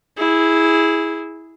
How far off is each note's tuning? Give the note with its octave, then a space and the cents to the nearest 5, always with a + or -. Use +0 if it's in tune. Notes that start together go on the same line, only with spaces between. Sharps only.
E4 -10 G#4 +0